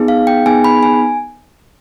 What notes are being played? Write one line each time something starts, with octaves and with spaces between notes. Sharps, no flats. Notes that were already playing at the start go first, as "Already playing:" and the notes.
Already playing: B3 D#4 G#4
F5
G5
B3 D#4 G#4 G#5
B5
G#5